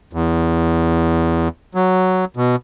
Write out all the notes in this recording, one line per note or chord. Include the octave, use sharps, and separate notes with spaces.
E2
F#3
B2